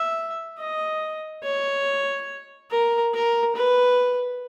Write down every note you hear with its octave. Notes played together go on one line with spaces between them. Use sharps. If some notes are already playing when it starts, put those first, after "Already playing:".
Already playing: E5
D#5
C#5
A#4
A#4
B4